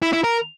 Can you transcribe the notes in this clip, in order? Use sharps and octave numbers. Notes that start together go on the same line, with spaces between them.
E4
E4
A#4